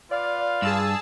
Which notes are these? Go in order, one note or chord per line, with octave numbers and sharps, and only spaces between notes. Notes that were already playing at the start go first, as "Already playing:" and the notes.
F4 B4 D5 F5
G2 G#4 A5 E6